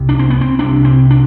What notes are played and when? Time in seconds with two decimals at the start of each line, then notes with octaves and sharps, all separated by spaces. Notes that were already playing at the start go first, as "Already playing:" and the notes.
Already playing: C2 C3
0.09 D4
0.19 C4
0.30 B3
0.41 C4
0.59 C2 C3 D4
0.85 C4
1.10 D4